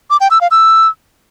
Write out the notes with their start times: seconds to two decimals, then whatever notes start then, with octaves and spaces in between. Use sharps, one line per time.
0.10 D6
0.21 G5
0.31 E6
0.41 F5
0.51 E6